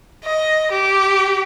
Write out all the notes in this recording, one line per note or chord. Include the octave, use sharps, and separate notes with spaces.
D#5
G4